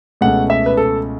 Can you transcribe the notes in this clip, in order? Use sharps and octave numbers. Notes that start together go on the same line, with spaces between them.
C#2 B2 A3 C#4 F#5
E5
B4
A4